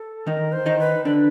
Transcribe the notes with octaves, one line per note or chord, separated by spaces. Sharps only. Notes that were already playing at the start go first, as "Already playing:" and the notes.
Already playing: A4
D#3 D#4 A#4
C5
D#3 D#4
B4
D3 D4 B4